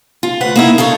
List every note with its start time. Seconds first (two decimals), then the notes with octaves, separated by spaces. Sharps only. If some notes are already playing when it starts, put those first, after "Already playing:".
0.23 F4
0.41 D2 B4 F#5
0.56 A#3 D#4 E4
0.78 D#4 F4 A4 C#5